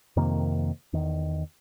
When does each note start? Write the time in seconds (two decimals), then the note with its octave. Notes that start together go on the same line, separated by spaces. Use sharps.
0.17 F2 C3 D#3 A#3
0.93 E2 D#3